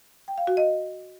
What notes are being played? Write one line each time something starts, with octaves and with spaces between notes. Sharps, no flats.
G5
F5
F#4
D#5